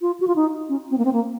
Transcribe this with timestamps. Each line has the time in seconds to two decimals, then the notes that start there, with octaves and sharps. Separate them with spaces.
0.02 F4
0.20 F#4
0.28 F4
0.36 D#4
0.69 C#4
0.91 C4
0.98 A#3
1.05 C4
1.13 A#3